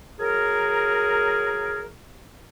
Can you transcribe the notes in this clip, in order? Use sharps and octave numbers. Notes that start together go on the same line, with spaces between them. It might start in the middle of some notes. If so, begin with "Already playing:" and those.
F#3 G#4 A#4